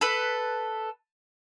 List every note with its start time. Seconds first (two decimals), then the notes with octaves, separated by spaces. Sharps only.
0.01 A4 B4